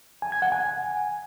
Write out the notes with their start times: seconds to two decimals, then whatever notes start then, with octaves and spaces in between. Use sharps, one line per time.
0.22 G#5
0.32 G#6
0.42 F#5
0.52 G#5